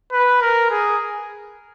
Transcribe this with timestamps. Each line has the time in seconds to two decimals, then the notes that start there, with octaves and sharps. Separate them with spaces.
0.12 B4
0.41 A#4
0.70 G#4